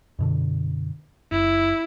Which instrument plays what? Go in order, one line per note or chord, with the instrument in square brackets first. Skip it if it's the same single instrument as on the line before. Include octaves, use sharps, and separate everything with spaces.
[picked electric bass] F#2 B2 D3
[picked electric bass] F#1 [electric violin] E4